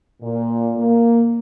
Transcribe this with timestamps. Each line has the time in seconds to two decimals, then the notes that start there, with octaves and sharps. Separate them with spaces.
0.21 A#2
0.76 A#3